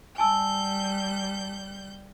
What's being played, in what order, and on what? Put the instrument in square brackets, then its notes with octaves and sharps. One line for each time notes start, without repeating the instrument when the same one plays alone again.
[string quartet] G3 G6 [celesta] G#5 A5 E6